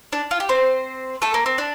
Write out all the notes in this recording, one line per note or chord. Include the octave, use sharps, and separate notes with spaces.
D4
F4
G4
C4 C5
A3 A4
A#3
C4
D4